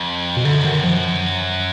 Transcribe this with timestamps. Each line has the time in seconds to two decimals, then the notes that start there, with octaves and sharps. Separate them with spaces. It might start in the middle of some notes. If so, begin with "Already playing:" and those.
Already playing: F2
0.37 B2
0.45 F#2 D3
0.64 D#3
0.84 F3